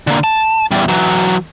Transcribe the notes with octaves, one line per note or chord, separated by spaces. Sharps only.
D3 A#3
A5
E2 G3
E3 F#3